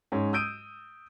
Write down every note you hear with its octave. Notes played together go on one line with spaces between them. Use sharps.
G#2 C#4
D#6 E6 G6 D7 D#7